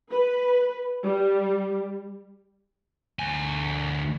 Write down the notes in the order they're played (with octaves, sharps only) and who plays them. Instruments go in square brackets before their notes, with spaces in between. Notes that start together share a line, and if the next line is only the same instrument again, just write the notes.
[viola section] B4
G3
[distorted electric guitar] D2 G#5